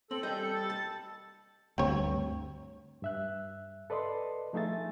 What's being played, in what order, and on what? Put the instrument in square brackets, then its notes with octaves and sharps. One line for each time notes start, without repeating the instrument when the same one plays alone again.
[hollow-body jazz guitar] C4 [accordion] A4 [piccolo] F#7
[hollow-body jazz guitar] G3 D#5 [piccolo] G6
[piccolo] C#7
A6
[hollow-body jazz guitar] A5
[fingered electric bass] D2 G2 [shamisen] C4 C#5
[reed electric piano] G2 E5 F#6
A4 B4 D5 D#5 C6
F3 A3 D#4 G#4 E5 A6